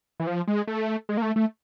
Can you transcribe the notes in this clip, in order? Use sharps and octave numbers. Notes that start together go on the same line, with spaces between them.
E3
F3
G#3
A3
G#3
A#3
A3
A3